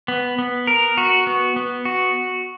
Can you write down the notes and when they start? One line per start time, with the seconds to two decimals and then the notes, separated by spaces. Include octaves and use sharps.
0.08 B3
0.38 B3
0.67 A#4
0.97 F#4
1.27 B3
1.56 B3
1.85 F#4